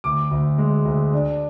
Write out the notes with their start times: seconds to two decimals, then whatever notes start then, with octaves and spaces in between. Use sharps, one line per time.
0.04 D2 D6
0.31 D2
0.58 G#3
0.85 D2
1.13 D4